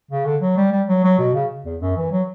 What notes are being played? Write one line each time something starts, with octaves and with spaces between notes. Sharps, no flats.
C#3
D3
F#3
G3
G3
F#3
F#3
B2
C#3
E2
F#2
E3
F#3